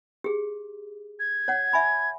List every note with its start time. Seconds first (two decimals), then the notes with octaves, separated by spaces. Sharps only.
0.24 G4 G#4
1.20 G#6
1.48 C#5 F#5
1.73 E5 G#5 B5